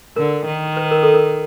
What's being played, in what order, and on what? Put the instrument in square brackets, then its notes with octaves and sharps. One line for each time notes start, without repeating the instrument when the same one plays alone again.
[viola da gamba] D3 [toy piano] A#4
[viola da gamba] D#3
[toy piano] B4
A#4
A4
A#4